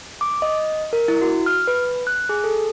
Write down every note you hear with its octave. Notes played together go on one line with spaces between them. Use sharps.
D6
D#5
A#4
E4
F#4
F6
B4
F#6
G#4
A4